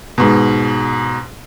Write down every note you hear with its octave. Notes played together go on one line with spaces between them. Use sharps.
G#2 B2